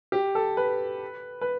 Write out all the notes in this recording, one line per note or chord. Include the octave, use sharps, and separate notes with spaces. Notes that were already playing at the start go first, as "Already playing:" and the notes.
G4
A4
B4
B4